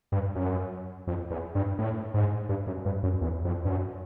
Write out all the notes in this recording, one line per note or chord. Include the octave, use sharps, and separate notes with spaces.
G2
F#2
F2
E2
G2
A2
G#2
G2
F#2
G2
F#2
E2
F2
G2
F#2